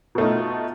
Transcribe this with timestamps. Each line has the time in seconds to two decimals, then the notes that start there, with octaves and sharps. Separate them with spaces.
0.15 B2
0.18 A3
0.21 D#4
0.24 F4